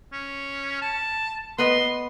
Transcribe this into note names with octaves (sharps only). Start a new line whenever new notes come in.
C#4
A5
B3 B4 D#5 C6